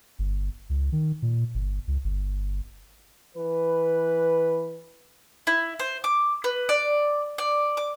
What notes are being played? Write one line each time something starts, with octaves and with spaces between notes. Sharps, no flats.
G1
C#2
D#3
A#2
G1
C#2
G1
E3 B4
E4
C5
D6
B4
D5
D5
D6